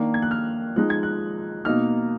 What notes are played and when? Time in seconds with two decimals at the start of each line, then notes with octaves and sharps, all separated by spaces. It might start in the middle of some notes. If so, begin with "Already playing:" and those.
Already playing: D#3 A#3 D4
0.14 G#6
0.22 F#6
0.31 F6
0.76 F3 G#3 D#4 F#6
0.90 G#6
1.03 F#6
1.65 B2 A#3 D#4 F6